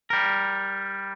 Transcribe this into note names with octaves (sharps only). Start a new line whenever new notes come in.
G3 A#4